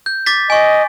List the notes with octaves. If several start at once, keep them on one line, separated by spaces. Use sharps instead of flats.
G6
D6 A6 B6
D#5 G#5 C#6